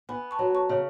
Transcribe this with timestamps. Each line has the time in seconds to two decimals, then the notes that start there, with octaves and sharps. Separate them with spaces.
0.09 B3 G#5 B5
0.31 A5 C#6
0.39 F#3
0.55 A5 C#6
0.69 C#3